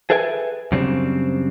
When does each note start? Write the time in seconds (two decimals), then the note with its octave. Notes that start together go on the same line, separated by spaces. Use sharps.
0.10 G#4 A4 B4 E5 G5 G#5
0.72 F#2 C#3 G3 C4 D4